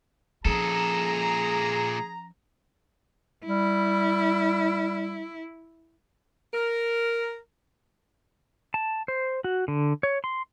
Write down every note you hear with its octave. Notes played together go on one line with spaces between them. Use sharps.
A#2 F3 C#4 G#4 A4 A#5
G3 E4
A#4
A5
C5
F#4
D3
C#5
C6